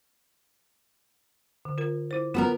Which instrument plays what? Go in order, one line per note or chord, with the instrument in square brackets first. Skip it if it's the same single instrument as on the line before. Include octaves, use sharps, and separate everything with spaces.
[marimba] D3
F4 A#4
E4 C5
[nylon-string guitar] B3 A4 A#4 [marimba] F4